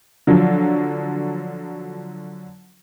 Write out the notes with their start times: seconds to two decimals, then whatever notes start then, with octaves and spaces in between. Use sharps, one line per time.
0.27 D3 F3 F#3